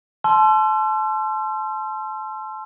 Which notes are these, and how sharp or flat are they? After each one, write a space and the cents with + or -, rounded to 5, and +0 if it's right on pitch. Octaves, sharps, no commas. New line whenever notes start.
A5 -30 C6 +0 E6 +40